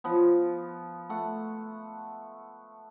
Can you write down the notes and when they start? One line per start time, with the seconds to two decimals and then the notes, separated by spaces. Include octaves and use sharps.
0.04 F3 B3
1.10 A3 F#5